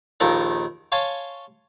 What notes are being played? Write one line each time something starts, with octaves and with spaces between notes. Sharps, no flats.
A#1 D#2 A#2 D#3 A4 A#4
C#5 F5 G#5 A5 C6 C#6